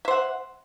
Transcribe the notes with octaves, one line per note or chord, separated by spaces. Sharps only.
C5 E5 F#5